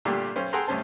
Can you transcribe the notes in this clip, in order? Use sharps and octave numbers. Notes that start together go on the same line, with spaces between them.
G2 A#2 D3 A3 A#3 G4
B1 C#4 C5
G#4 A4 F#5 G5 A#5 C6
D2 G2 C3 C#4 C5 A5